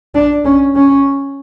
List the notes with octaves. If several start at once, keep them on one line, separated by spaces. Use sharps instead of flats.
D4
C#4
C#4